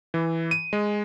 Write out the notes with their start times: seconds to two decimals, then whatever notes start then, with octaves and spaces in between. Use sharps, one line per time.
0.14 E3
0.51 D#7
0.73 G#3